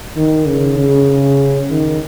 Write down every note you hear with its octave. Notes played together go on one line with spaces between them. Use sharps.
D#3
C#3
C#3
D#3